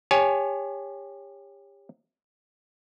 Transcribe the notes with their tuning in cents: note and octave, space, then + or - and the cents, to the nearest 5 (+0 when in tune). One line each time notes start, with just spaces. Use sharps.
G4 +35 C#5 +0 G#5 +30